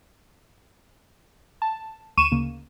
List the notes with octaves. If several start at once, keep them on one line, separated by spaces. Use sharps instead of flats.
A5
D2 C#6 D#7 E7
D2 C#3 A#3